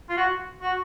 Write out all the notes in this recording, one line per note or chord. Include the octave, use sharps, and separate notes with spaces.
F4
F#4
F#4